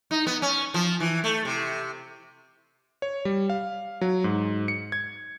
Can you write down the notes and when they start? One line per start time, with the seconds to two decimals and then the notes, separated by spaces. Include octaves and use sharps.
0.11 D#4
0.27 B3
0.42 C#4
0.74 F3
1.00 E3
1.24 A3
1.45 C3
3.02 C#5
3.25 G3
3.50 F5
4.01 F#3
4.24 G#2
4.68 C#7
4.92 G#6